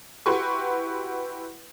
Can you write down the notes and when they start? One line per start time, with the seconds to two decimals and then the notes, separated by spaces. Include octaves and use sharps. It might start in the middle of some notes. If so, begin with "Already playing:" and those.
0.26 E4 F#4 G4 B4 C6 C#6